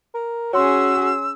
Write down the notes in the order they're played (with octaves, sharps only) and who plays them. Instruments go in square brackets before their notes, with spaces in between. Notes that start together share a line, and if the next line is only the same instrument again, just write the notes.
[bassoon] A#4
[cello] C#4 G#4 [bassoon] F#4 [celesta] C#5 C6 [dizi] E6